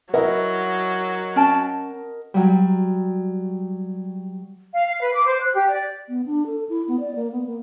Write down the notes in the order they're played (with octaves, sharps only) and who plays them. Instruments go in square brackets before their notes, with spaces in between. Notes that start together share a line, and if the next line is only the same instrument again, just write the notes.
[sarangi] F#3 [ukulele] E4 [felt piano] A#4 D#5 F#5
[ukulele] C#4 G5 A5
[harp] F#3 G3
[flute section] F5
F5
B4
D6
C5
F#6
G4
D5
[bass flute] B3
D4
A4
E4
B3
D5
A#3
B3
A#3